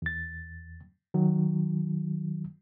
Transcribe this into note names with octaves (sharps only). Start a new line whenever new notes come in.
E2 A6
D#3 F#3